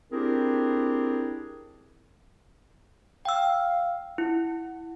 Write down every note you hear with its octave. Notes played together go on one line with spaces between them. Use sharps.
C4 D4 E4 G4 G#4 A#4
F5 G5 E6
E4 F#5